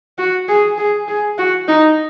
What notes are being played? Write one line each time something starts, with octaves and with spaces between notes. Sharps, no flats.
F#4
G#4
G#4
G#4
F#4
D#4